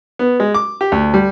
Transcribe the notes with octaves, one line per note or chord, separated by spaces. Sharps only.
B3
G#3
D6
G4
D2
G3